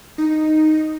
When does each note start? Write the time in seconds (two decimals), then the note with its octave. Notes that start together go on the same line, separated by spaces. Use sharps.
0.18 D#4